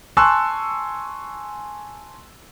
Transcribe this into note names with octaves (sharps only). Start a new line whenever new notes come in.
G#5 A5 C6 C#6 E6 F#6